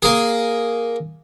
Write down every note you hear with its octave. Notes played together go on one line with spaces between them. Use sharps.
A#3 G#4